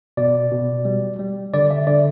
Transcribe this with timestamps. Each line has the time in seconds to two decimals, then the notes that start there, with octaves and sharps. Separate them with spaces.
0.17 B2 D5
0.51 B2
0.85 G3
1.19 G3
1.53 D3 D5
1.71 E5
1.87 D3 D5